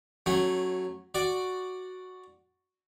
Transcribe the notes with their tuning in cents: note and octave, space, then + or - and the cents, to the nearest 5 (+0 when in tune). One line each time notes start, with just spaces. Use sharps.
F#3 +0 A3 +0 C#4 -20
F#4 +0 D5 +0